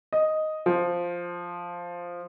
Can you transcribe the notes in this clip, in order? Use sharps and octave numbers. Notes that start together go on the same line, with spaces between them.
D#5
F3